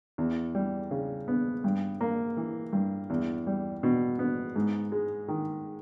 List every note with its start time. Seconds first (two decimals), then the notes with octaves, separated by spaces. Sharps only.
0.18 E2
0.55 G3
0.91 C#3
1.28 B3
1.64 G2
2.01 A#3
2.37 E3
2.73 G2
3.10 E2
3.47 G3
3.83 B2
4.19 B3
4.56 G#2
4.92 G#3
5.28 D#3